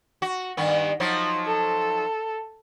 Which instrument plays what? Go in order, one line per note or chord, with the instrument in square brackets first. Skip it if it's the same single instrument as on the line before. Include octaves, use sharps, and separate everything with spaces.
[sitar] F#4
G2 D#3 B3
F3 F#3 D#4
[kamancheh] A4